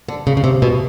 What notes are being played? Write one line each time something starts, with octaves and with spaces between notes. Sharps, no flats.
D3
C#3
C#3
C3
B2